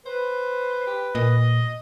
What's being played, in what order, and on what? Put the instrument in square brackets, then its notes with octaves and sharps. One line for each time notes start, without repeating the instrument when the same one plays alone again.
[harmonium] B4 [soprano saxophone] C5
[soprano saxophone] G4
[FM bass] A#2 [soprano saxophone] D#5